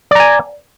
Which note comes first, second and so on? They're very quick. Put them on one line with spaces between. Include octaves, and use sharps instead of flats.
D5 A#5 G#5